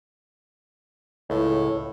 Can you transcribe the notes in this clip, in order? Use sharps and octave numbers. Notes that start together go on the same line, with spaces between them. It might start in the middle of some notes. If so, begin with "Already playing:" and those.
C#2 A2